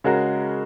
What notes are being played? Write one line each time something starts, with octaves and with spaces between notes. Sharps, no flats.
C#3 G#3 F#4 A#4